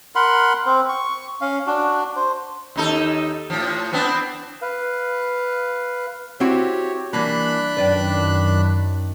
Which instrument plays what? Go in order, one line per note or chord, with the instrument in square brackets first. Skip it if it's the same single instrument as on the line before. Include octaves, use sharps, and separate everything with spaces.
[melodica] A#4 F#5 B5 C6
C4 C5
C#6
C#4 F5
D4 F#4
C5
[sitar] D#2 D#4 A4
A2 F3
B3 C4 D4
[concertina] B4 F5
[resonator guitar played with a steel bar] C4 E4 F#4 [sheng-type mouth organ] G4 C#5
[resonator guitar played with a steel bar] E3 G3 A#3 [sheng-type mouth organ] D4 B5 F#6
[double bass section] F#2 D#3 [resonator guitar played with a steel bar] B4 D5 G5